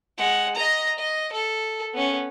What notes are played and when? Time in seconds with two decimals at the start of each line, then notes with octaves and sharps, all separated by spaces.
0.18 G#3 F#5
0.56 D#5 A#5
0.99 D#5
1.32 A4
1.94 B3 C#4